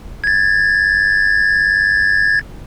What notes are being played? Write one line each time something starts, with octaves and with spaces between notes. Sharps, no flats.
G#6 A6